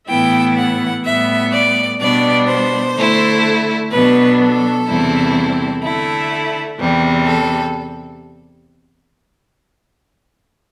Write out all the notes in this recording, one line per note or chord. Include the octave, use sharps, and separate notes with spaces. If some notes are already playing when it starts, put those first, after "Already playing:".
A2 E3 B3 E4 G5
F#5
A2 G3 B3 E5
D5
B2 G3 B3 D4 D5
C5
D3 A3 E4
B2 F#3 B3 D4 B4
A4
E2 C3 G3 C4 E4
D3 A3 E4
E2 C3 G3
A4